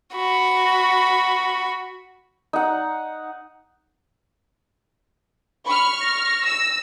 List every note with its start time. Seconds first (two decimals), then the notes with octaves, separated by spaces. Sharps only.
0.15 F#4 B5
2.53 D#4 F#5
5.66 B5 C#6 F6
6.01 A#6
6.44 E6